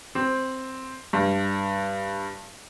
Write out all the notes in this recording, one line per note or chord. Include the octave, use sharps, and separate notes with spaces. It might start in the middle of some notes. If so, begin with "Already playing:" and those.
C4
G2